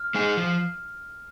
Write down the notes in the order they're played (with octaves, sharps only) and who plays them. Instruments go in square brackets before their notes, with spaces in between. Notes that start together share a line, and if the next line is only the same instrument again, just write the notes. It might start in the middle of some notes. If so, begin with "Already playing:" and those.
Already playing: [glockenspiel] F6
[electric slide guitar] G#3 D#4 G#4
F3